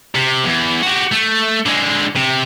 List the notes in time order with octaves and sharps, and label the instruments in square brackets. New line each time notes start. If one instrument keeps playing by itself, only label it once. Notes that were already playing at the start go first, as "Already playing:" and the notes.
[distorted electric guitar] C3
E2
F#4 G4
A3
D3 G#3
C3